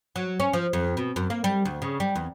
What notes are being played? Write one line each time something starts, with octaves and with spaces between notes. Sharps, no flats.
F#3
C#4
F3
F2
B2
F#2
A#3
G3
D2
C#3
G3
E2